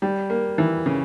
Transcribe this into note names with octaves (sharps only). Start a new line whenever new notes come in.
G3
A#3
E3
C#3